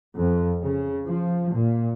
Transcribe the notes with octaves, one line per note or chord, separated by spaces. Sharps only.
F2
C#3
F3
A#2